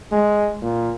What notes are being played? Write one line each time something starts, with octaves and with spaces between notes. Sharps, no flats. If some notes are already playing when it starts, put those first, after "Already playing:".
G#3
A#2